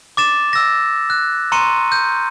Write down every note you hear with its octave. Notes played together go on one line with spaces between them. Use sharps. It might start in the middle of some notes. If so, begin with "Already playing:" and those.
D6 A6 E7
E6 A#6
F#6
A#5 C6 C#6 C#7 D#7
G6